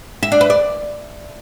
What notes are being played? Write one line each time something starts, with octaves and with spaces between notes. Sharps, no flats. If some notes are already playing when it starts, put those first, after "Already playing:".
E5
D4
B4
D5